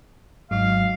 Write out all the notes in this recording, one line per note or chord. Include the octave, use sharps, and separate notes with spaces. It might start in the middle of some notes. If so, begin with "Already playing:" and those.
G#1 G#2 F#3 F5